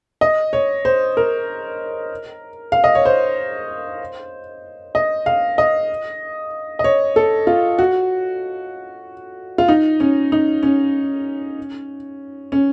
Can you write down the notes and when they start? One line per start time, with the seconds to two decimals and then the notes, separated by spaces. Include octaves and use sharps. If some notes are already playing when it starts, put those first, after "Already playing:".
0.21 D#5
0.53 C#5
0.85 C5
1.17 A#4
2.72 F5
2.84 D#5
2.95 C#5
3.05 C5
4.95 D#5
5.26 F5
5.58 D#5
6.79 D#5
6.84 C#5
7.16 A4
7.47 F4
7.79 F#4
9.58 F4
9.68 D#4
10.00 C#4
10.32 D#4
10.63 C#4
12.52 C#4